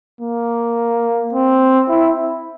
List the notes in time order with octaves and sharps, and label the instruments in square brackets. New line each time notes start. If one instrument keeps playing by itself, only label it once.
[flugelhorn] A#3
C4
E4